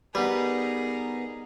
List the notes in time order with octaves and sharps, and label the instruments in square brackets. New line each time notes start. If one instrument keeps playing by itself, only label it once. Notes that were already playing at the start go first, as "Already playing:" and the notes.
[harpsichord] G3 [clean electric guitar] B3 B4 [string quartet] D#4 G#4 A#4